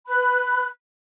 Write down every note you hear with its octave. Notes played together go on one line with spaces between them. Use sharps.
B4 B5 F#6